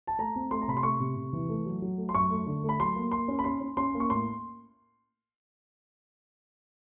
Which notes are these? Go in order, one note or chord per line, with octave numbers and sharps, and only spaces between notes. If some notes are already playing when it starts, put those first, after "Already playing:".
A5
A3 A#5
C4
A3 C6
A#5
C3 B5
C6
A3 C#6
C3
C3
E3
A3
F#3
F#3
A3
C6
F#2 C#6
A3
D3
A3
B5
F#3 C6
A#3
A#3 C6
C#4
B5
C#4 C6
C#4
C#4 C6
A#3
C#6
A2 C6